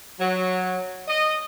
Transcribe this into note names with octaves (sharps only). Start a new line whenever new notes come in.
F#3
D#5